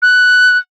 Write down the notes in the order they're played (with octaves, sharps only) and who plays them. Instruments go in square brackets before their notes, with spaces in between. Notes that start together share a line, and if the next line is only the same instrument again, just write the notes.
[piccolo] F#6